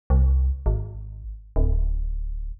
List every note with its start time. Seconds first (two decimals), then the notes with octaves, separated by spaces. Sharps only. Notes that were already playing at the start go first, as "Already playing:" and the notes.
0.10 C2
0.66 G#1
1.56 D1